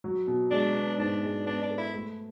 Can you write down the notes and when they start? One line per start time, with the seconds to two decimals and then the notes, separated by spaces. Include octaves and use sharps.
0.04 F#3
0.27 B2
0.51 G#3 D4
0.75 B3
0.98 G#2 D4
1.23 G#3
1.46 B3 D4
1.63 D4
1.70 A4
1.78 E4
1.94 A3